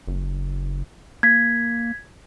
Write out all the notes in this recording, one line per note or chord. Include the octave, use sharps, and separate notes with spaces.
F#1
A#3 G#6 B6